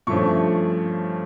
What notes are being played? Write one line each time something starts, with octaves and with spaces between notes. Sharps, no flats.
G2 F3 A3 C#4 C#6